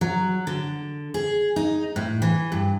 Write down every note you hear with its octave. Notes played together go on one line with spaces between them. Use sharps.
F#3
D3
G#4
D#4
A2
E3
G2